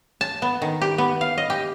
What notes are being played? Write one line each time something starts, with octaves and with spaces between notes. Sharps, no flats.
A5
B3
D#3
G4
B3
F5
D#5
G4